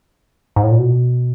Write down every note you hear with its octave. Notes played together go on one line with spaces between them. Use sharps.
G#2
A2
A#2
B2